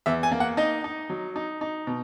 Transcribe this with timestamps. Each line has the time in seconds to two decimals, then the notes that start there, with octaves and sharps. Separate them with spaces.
0.06 E2 E5
0.23 G#5
0.32 A#3
0.40 F#5
0.57 D#4 D#5
0.84 D#4
1.10 F#3
1.36 D#4
1.61 D#4
1.87 B2